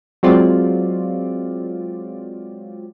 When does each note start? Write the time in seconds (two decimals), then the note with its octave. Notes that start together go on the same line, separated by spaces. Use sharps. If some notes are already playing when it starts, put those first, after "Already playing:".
0.23 F#3 G#3 C4 F4 D5